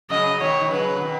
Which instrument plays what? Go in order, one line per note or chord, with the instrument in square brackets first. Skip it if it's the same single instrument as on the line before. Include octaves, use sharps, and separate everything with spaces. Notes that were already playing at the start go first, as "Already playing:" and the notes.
[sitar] C#3 F#3 [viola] D#5
[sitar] B2 D#3 [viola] C#5
[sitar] D#3
[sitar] C#3 F#3 [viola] B4
[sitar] C#3
B2 D#3